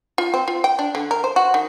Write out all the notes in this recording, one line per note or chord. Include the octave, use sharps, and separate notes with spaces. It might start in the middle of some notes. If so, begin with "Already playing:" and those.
F4
C4
F4
G5
D4
D3
A#4
C5
F#4
D#3